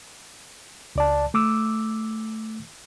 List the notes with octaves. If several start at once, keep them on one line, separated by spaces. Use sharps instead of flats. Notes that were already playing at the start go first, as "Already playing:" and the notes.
C#2 D5 A5
A3 D6 E6